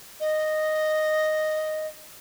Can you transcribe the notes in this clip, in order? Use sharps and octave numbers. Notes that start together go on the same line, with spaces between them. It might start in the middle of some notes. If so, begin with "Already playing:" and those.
D#5